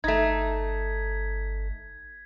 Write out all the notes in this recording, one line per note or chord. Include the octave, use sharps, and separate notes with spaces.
G1 A3 D#4 G#6 B6